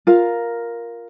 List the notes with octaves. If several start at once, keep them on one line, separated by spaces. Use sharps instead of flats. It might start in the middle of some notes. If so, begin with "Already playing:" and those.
F4 A#4 F5